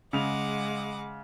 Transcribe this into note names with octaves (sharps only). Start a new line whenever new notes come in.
C#3 G#3 F#5 D6 F7